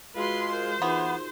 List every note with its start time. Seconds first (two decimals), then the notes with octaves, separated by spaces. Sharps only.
0.16 G#3 F4 F#4 B4 C6
0.52 A#4 C5
0.82 E3 B3 D#4 F4 G#4